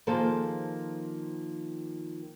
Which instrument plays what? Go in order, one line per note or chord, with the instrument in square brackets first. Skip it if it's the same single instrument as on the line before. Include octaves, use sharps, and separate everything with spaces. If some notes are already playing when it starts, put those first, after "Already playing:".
[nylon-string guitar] D#3 F3 A#3 G#4 A4 C5